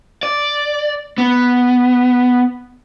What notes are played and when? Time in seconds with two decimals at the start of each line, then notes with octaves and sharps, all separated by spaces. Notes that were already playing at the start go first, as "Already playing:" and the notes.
0.23 D5
1.18 B3